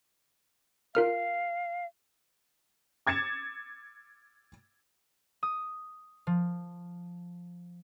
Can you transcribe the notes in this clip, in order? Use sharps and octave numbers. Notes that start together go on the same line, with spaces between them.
F4 A#4 F5 F6
D6 G#6 A6 C#7 E7
D#6
F3